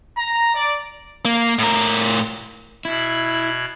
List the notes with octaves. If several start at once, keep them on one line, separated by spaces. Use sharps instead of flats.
A#5
D5
A#3
A2 A#4
B2 E4 B5 G#6